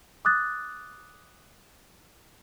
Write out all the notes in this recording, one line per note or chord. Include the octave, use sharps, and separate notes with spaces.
D6 D#6 F#6 A6